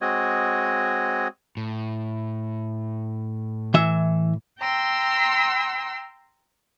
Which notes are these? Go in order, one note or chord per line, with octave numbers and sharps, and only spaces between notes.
G#3 C4 F#4 C#5 D#5
A2
E3 E5
G5 A#5 C6 E6